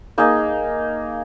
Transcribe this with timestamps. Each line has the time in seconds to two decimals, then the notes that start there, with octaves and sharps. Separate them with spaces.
0.18 A#3 D#4 G#4 D#5